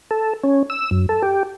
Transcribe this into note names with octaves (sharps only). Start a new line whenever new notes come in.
A4
C#4
E6
F#2
A4
G4